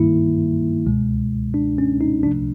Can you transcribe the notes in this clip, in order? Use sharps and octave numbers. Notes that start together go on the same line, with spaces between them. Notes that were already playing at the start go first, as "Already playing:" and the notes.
Already playing: G2 D#3 G3 A#3 E4
C#2 B2 G#3
D4
C#4
D#4
C2 C3 F3 A3 D4